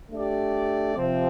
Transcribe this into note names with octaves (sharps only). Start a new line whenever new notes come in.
A3 D4 G4 D5
C3 F3 C4